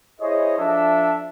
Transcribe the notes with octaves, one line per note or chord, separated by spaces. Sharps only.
E4 G#4 C5 C#5 D#5
F3 D4 A4 E5